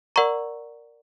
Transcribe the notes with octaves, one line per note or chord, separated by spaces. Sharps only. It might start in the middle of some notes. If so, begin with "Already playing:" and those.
A#4 D5 F#5 A#5 C#6